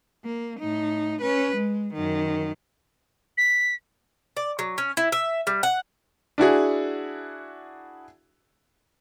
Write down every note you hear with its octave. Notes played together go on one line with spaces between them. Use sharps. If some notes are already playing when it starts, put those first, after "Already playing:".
A#3
A2 D#4
C#4 B4
G#3
F#2 D#3
B6
D5
F#3
C#4
E4
E5
G3
F#5
D4 E4 F#4 G#4